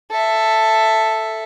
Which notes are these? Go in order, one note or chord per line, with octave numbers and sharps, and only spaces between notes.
A4 E5